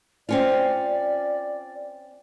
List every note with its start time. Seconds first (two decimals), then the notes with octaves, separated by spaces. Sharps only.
0.29 C4 C#4 F4 D5